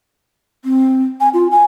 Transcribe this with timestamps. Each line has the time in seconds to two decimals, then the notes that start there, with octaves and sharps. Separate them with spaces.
0.65 C4
1.21 G#5
1.34 F4
1.51 G#5